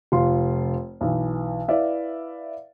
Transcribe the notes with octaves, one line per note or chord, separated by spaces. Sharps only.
F1 F4 C6
B1 E3
E4 B4 D5 E5 F5